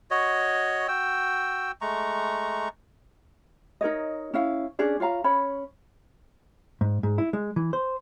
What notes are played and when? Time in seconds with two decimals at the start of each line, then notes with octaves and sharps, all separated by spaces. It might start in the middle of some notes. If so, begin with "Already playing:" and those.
0.11 F#4 C#5 D#5
0.88 F#4 G5 E6
1.81 G#3 A3 A#5 C#6
3.81 D#4 A#4 C#5 D#5
4.34 C#4 E4 F5
4.79 C#4 D4 G#4 D5
5.00 F4 C#5 F5 A#5
5.24 C#4 C#5 B5
6.81 G#2
7.03 G#2
7.18 E4
7.33 G#3
7.56 E3
7.73 C5